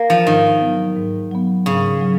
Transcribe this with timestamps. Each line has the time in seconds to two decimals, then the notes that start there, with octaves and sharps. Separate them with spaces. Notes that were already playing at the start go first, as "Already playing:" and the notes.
Already playing: A#3
0.10 F3
0.26 G#2 D#3
0.61 F#3 B3
0.97 G#2
1.31 F#3 B3
1.66 G#2 C#3
2.01 F#3